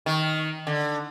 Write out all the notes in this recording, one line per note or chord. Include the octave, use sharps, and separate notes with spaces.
D#3
D3